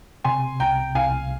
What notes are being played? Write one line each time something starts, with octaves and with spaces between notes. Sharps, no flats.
C3 G#5 C6
C2 G5 A#5
C2 F5 G#5